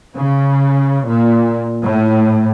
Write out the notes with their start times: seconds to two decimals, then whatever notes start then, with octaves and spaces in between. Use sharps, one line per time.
0.16 C#3
1.05 A#2
1.82 A2